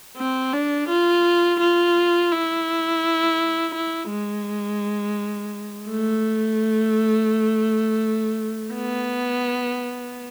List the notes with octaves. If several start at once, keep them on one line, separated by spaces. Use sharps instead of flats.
C4
D4
F4
F4
E4
E4
G#3
A3
B3